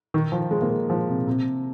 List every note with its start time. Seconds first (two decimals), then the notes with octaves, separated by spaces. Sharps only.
0.14 D#3
0.32 F3
0.51 G#3
0.62 A#3
0.70 G#3
0.90 F3
1.09 C3
1.27 C3